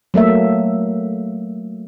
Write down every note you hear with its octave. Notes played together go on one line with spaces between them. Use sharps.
F#3 A3 A#3 E5